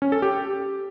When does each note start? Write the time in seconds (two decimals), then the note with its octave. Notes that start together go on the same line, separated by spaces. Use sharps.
0.02 C#4
0.12 A4
0.22 G4